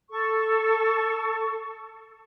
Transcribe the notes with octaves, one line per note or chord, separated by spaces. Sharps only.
A4 C#6